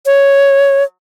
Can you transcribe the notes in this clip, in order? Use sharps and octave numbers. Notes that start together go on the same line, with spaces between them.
C#5